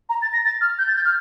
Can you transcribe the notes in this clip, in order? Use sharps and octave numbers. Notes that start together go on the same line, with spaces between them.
A#5
A6
A#6
A6
F6
G6
A6
G6
F6